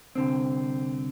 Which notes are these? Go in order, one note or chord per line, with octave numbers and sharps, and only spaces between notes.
C2 D3 C4